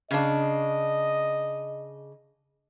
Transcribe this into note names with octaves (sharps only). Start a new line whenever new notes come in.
C#3 D4 D#5